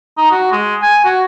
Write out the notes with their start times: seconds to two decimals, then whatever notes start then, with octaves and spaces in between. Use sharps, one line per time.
0.18 D#4
0.31 F#4
0.52 G#3
0.82 G#5
1.05 F#4